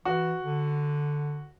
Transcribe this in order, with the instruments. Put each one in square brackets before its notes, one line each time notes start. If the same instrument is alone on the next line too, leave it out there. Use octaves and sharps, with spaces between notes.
[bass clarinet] E3 [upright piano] F#4
[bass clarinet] D3